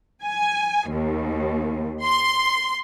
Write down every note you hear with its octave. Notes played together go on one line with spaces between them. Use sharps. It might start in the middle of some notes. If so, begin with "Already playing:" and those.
G#5
D#2
C6